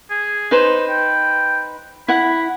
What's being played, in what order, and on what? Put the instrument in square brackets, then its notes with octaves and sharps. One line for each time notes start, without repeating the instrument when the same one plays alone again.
[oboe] G#4
[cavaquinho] D#4 B4 C5
[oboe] G5
[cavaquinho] E4 F#5 [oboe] B5